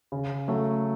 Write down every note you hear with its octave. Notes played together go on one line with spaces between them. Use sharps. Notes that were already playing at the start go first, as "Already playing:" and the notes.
C#3
F#3 A3